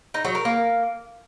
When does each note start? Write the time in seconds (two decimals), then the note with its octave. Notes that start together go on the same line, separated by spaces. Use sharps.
0.14 D#4
0.25 F#3
0.35 A#4
0.45 A#3